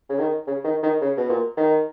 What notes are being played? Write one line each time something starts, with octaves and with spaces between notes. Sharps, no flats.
C#3
D#3
C#3
D#3
D#3
C#3
B2
A#2
D#3